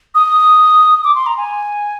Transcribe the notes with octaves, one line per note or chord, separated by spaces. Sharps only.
D#6
D6
C6
A#5
G#5